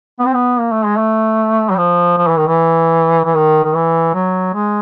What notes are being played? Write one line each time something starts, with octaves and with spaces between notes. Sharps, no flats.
B3
C4
B3
A#3
A3
G#3
A3
F#3
F3
F3
E3
D#3
E3
E3
D#3
D#3
E3
F#3
G#3